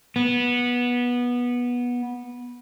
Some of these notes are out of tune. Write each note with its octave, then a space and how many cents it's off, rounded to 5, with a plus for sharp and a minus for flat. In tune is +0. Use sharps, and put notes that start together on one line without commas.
B3 -15